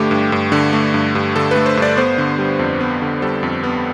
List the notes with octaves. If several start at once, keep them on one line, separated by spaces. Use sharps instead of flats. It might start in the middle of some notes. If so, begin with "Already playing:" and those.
Already playing: G2 D3 A3 G4
G2
G2
D3
A3
G2
G2
D3 A4
B4
A3
C5
G2
D5
B3 C5
D3
G3
F2
B3
D3
G3 A4
F2
B3